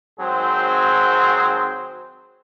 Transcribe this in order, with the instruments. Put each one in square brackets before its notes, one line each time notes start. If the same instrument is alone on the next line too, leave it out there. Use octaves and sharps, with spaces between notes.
[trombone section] G#1 F#3 C4 G#4 C5